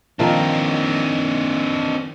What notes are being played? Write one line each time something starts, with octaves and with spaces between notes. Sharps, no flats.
D#3 F3 C4 D4